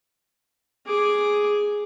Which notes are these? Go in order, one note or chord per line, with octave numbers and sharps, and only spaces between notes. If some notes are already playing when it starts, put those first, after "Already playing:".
G#4 D6